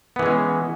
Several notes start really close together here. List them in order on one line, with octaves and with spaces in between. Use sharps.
B3 E3 G#3 C#4